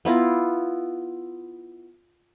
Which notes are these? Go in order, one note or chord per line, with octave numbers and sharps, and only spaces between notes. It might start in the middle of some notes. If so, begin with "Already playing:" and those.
B3 E4 F4 A#5